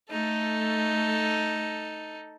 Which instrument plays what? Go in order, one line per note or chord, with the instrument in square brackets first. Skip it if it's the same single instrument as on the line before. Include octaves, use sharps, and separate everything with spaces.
[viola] A3 [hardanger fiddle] D#4 A4